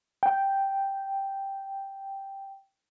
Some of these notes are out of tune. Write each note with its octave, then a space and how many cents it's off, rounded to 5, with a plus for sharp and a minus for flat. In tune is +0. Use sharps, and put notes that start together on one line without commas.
G5 +0